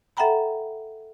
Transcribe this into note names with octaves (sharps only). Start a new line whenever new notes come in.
A4 E5 F#5 G5 A#5 B5